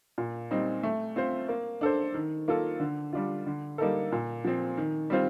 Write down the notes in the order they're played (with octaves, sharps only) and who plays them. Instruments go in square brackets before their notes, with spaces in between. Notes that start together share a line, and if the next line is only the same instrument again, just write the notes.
[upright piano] A#2
G3 C4 D#4
A3
C4 F4 C5
A#3
D4 A4 C5
D#3
A#3 F4 A4
D3
G3 D4 F4
D3
G3 A#3 D#4 A4
A#2
F3 C4
D#3
G3 C4 F4 C5